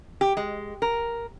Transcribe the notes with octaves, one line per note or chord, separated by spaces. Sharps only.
G4
G#3
A#4